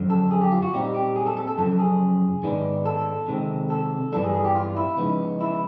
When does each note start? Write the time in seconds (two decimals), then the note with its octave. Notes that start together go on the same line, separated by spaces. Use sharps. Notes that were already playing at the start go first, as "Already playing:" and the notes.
Already playing: F#2 D3 F3
0.10 A4
0.31 G#4
0.42 G4
0.52 F4
0.62 F#4
0.73 A#2 G3 C4 D#4 G4
0.94 G4
1.16 G#4
1.26 A4
1.37 A4
1.48 A4
1.58 F#2 C#3 F3 A4
1.79 G#4
2.43 G#2 D#3 G#3 B3 D4
2.86 A4
3.28 C3 D#3 G#3 C4
3.70 A4
4.12 G2 E3 G3 B3 D4 A4
4.24 G#4
4.34 G#4
4.45 G4
4.55 F4
4.77 E4
4.97 C#3 F3 G#3 B3 D#4
5.41 E4